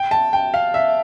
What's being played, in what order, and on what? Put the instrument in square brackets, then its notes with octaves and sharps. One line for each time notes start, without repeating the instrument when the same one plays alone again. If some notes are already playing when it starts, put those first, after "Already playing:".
Already playing: [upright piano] G5
A5
G5
F5
E5